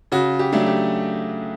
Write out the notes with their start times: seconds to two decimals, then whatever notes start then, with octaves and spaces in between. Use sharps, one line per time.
0.12 C#3 F#4
0.39 G4
0.52 F#3 A3 D4
0.66 G4